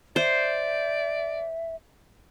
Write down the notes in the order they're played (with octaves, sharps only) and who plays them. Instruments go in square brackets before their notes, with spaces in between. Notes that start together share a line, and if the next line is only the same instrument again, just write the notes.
[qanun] C5 [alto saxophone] D5 [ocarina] E5